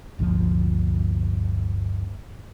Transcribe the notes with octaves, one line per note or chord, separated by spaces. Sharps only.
G1 D2 A#2 F3